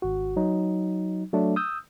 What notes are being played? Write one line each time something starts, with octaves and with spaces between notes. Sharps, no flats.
G#1 F#4
F#3 D#4
F#3 A3 D4
D#6 E6 G6